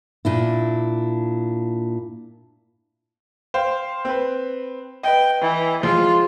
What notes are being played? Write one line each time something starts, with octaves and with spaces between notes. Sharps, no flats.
A#2 D4 E4
C5 F5 G5
C4 B4
B4 D#5 G5
E3
F3 G#3 F4